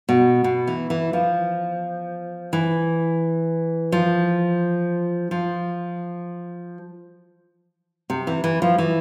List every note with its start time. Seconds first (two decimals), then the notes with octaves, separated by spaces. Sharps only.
0.09 B2
0.44 B2
0.67 E3
0.90 E3
1.13 F3
2.53 E3
3.92 F3
5.31 F3
8.10 C3
8.27 E3
8.44 E3
8.62 F3
8.78 E3